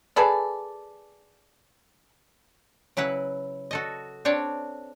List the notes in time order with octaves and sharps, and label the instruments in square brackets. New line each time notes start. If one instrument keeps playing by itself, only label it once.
[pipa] G#4 A4 B4 D5
[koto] C#3 F#3 E4 B4 F#5
F#4 A4 D#5
C4 D4 C#5 D5